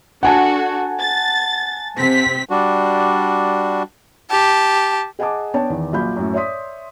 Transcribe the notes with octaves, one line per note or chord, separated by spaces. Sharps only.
D4 F#4 A4 F#5 G#5 A5
A6
C3 C4 B6
G3 D4 F#4
G4 A5
G#4 D#5 F#5 G#5 A5 D6
B3 D4 C#5 G5 A5
E2 D#3
A#1 F#3 F4 B5 G6
F#2 A2
C#5 D5 E5 C6 D#6 B6